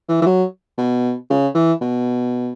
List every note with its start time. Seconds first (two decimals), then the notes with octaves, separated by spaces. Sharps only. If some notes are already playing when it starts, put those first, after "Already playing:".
0.09 E3
0.22 E3
0.26 F#3
0.78 B2
1.30 C#3
1.55 E3
1.81 B2